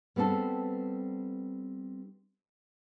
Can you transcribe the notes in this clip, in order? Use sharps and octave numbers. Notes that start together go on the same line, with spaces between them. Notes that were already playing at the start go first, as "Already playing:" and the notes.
G3 B3 C4 D4 A4